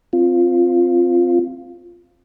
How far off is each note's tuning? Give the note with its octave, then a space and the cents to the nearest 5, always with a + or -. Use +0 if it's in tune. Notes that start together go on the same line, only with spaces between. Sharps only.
C4 +0 F4 +0